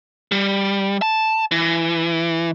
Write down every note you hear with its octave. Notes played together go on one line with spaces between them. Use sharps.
G3
A5
E3